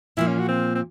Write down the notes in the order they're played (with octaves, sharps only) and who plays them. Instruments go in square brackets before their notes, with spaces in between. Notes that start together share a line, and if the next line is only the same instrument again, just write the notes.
[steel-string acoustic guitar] A#2 F3 A#3 [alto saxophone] E4
[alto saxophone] C#4
F#4
C4
C4